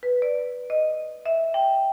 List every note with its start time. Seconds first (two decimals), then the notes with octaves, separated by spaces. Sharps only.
0.03 B4
0.22 D5
0.70 D#5
1.26 E5
1.54 G5